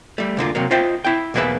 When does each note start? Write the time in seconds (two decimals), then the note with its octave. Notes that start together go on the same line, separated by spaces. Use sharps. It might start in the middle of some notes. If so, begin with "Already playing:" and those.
0.18 G3 A3
0.37 D2 D3 A#3 F4
0.55 C3 F#3 A#3
0.71 F4 C5 D#5 E5 G5
1.04 E4 G5
1.34 B1 E2 A#3 G#4 B4 E5